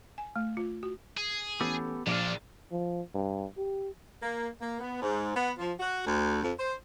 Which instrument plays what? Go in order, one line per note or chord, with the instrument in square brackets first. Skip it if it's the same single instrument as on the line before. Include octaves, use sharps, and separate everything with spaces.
[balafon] G#5
A3
F4
F#4
[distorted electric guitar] G#4
[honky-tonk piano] E3 A3 C#4 [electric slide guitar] B3 G4 A4
[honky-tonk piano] A#1 D#7 [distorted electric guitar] A#2 D4 [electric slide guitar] F3 D5 F5
[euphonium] F3
G2
G4
[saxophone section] A#3
A#3
B3
G#2
B3
F3
F#4
D2
F2
C5